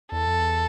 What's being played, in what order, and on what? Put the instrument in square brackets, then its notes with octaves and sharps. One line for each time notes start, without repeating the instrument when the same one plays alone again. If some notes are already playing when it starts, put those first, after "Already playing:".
[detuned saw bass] E2 [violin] A4
[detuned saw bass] F2
E2